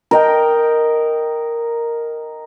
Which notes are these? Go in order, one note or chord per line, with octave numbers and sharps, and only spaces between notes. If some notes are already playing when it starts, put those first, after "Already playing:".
A#4 D#5 G5